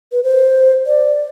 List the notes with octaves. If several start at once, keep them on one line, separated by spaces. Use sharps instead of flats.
B4
C5
D5